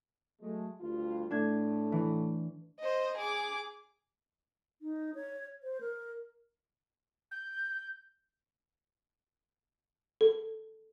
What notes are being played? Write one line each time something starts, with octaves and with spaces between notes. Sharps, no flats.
F#3 G#3 A3
D2 G2 F4
A2 A3 D4 G#6
E3
C5 D#5
G#4 D6
D#4
C#5
C5
A#4
G6
A4